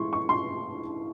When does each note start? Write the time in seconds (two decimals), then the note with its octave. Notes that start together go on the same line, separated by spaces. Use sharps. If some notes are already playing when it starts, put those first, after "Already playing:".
Already playing: A2 E3 G#3 C6 C#6
0.13 C#6
0.29 C6